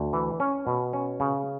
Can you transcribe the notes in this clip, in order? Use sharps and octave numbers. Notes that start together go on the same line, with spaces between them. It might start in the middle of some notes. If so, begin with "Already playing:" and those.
Already playing: D2
E3
C#4
B2
C#4
C#3